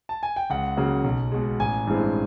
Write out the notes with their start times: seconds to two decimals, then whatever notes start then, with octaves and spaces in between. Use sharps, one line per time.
0.09 A5
0.23 G#5
0.36 G5
0.50 C#2 F#5
0.77 C#3 F#3 A#3
1.04 B1
1.32 B2 G#3
1.59 A1 G#5
1.87 G2 E3 G#3 C4